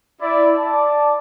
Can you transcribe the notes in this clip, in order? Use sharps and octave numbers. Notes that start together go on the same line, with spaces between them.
E4 D5
D5 A5